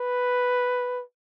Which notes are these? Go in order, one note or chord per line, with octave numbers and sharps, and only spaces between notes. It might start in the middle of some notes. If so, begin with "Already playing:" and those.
Already playing: B4